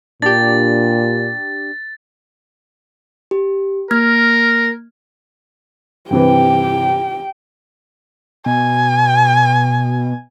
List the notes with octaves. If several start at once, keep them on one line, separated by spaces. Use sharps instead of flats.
A#2 D4 G4 A6
G4
A#3 A#4 F6 G#6
G2 C3 E3 G4 G5
B2 G#5